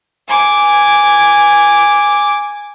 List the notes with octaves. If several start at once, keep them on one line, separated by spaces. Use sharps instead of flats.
G#5 D6